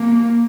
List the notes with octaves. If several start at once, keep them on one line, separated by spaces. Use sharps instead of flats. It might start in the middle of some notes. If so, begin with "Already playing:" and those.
Already playing: A#3